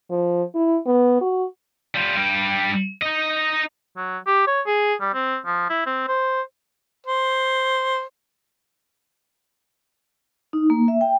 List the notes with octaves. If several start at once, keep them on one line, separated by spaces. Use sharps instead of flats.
F3
E4
B3
F#4
G3 F4
G2 G3
D#4 D#5
F#3
G4
C#5
G#4
G3
C4
F3
E4
C4
C5
C5
D#4
A#3
E5
G5